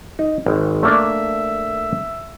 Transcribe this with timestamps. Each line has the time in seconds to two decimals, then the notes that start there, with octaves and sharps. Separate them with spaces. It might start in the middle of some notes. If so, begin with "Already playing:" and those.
0.19 D#4
0.46 G#1
0.83 A3 A#3 D4 E5